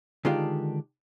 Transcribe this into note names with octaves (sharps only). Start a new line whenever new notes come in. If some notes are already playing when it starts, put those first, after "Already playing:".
D3 D#3 G#3 D4 F4 G4